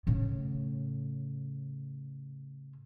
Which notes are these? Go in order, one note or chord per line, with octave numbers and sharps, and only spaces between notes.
A2 C#3